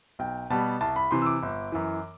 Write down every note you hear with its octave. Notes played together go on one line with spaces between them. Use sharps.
B1 G5
B2 G3 B3 A5
C2 A5
B5
C3 E3 C6
E6
D6
G1
F#2 E3